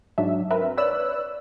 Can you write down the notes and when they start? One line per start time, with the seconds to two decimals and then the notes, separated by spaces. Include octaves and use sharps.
0.18 G#2 F#3 D4 E5
0.51 C4 A#4 B4 E5
0.77 B4 C#5 D5 E6 F#6